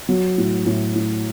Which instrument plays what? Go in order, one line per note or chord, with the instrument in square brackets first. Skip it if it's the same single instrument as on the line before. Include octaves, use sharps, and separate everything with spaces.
[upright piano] F#3
A2
A2
A2